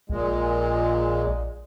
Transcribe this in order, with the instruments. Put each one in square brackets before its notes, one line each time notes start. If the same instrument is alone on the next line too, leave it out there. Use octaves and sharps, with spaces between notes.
[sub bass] A#1 [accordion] A#2 G#3